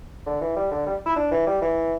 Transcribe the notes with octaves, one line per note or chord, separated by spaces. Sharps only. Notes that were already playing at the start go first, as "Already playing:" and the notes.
D3
E3
G3
D3
G3
E4
D4
E3
G3
E3